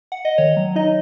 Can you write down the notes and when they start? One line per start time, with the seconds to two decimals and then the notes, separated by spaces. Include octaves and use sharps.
0.12 F#5
0.25 D#5
0.38 D#3 C#5
0.57 F#3
0.75 D#4 D#5